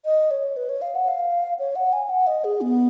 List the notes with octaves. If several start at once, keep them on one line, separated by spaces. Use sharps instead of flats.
D#5
C#5
B4
C#5
F5
F#5
F5
C#5
F#5
G#5
F#5
D#5
G#4
B3